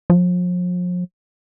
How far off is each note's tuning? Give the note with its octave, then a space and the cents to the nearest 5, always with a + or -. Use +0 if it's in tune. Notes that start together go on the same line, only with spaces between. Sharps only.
F3 +40